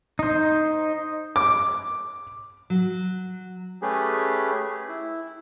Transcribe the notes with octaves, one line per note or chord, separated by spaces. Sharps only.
D#4 C5
D6
F#3
A3 C#4 G4 G#4 B4
E4